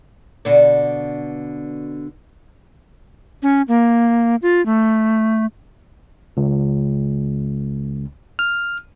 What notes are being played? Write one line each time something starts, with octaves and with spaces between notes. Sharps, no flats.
B2 D3 D4
C#4
A#3
F4
A3
C#2
F6